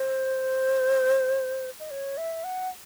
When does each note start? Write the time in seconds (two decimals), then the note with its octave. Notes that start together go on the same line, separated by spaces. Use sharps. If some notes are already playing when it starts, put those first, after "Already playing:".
Already playing: C5
1.80 D#5
1.91 C#5
2.17 E5
2.44 F#5